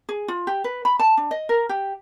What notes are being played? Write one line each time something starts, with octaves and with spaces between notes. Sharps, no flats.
G#4
F4
G4
B4
B5
A5
D4
D#5
A#4
G4